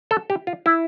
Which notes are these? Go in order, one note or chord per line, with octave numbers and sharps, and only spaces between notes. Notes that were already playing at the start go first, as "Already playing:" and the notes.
A4
G4
F4
E4